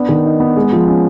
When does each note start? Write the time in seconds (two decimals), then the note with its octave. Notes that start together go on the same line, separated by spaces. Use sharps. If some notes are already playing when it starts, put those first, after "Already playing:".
Already playing: B3 D4
0.09 D#3
0.25 D#4
0.40 B3
0.56 G#3
0.72 F3
0.88 C#4